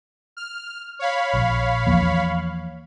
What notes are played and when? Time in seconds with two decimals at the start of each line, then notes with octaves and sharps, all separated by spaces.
0.37 F6
0.99 C#5 F5 B5
1.34 A#1
1.87 E2 F3 A#3